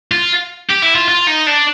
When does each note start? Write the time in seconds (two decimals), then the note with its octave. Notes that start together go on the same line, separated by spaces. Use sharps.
0.12 F4
0.70 G4
0.82 E4
0.95 F4
1.08 F4
1.27 D#4
1.47 D4